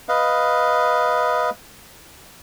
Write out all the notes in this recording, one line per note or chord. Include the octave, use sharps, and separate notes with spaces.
B4 D#5 F5